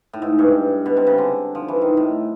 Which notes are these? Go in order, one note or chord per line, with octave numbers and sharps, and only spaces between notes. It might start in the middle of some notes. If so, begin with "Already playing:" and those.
A2
G#2
G2
B2
C3
C#3
D3
F3
E3
D#3
A2